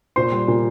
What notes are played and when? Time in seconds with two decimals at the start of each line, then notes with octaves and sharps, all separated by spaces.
0.16 A#2 C5 C6
0.32 G3
0.48 A#2